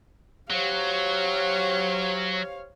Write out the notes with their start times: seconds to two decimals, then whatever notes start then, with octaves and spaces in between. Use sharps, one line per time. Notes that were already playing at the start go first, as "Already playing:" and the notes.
0.51 F#3 G4 C5 C#5 F5